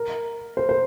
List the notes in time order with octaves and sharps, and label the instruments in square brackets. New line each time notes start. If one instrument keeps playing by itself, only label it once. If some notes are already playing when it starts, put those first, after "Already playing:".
Already playing: [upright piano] A#4
C5
C5